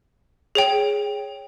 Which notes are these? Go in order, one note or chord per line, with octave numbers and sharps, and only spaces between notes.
G#4 C#5 G5